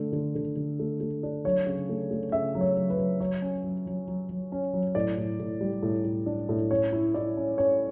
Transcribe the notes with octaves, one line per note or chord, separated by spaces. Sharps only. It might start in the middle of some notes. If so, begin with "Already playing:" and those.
Already playing: D3 A3
D3
D3
D3
A3
A3
D4
F#3 C#5
C#3
A3
A3
C#3 E5
F#3
C#5
F#3
B4
F#3
F#3 C#5
C#4
F#3
F#3
F#3
F#3
C#4
F#3
A2 D5
A2
A2
G3
A2
A2
D4
A2
C#4 C#5
E4
E4 D5
C#4
C#4 C#5